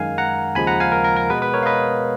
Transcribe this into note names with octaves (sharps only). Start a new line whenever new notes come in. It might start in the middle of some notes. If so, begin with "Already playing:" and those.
Already playing: F#2 D#3 G#3 F5 G#5
F#5 A#5
D#2 C#3 F3 G#3 G#5 B5
F#5 A#5
F5 G#5
A#4
A#4
A#4
B2 G#3 B3 B4
B4
A#4 C#5
F5
B4 D#5